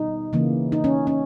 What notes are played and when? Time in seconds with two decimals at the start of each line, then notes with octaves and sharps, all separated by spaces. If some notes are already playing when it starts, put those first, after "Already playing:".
Already playing: B2 G3 B3 D#4
0.33 C#3 E3 A#3
0.72 D#4
0.84 C#4
1.07 C#4